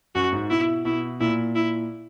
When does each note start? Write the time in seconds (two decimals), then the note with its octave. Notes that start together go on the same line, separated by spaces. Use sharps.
0.15 F#2 F#4
0.33 G#2
0.50 B2 E4
0.85 B2 E4
1.20 A#2 E4
1.56 E4